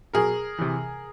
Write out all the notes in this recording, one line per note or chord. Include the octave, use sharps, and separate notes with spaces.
B2 F#3 G#4 A#4
C3 E3